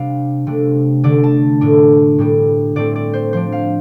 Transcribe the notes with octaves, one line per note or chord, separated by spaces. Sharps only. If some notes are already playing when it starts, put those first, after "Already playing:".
Already playing: C3 G3 D4 F5
C3 A3 D4
D3 A3 D4 D5
A5
A2 A3 D4
A2 G3 D4
A2 A3 C4 D5
D5
C5
F3 D4 C5
F5